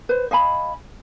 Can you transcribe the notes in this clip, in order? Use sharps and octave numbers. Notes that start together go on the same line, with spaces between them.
B4 C5
D#5 F5 G#5 B5